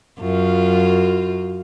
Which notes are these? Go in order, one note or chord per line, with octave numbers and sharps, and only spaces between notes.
F#2 F4